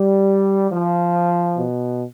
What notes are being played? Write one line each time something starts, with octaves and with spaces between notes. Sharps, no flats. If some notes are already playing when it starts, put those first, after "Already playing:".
Already playing: G3
F3
B2